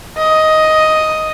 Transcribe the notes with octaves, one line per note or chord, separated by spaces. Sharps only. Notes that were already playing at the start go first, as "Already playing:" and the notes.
D#5